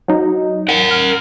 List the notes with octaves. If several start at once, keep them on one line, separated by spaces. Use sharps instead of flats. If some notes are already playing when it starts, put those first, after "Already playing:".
F#3 D#4
A#4 F#5
F6